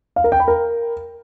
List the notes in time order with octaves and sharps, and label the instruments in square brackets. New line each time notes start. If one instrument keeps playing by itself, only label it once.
[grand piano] F5
A#4
G5
B5
A#4